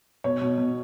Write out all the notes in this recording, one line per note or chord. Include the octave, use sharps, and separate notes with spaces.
B2 C#5
B2
B2